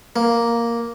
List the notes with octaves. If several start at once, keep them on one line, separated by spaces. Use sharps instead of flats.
A#3